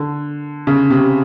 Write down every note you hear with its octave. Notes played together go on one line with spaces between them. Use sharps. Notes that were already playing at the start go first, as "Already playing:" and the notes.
Already playing: D3
C#3
C3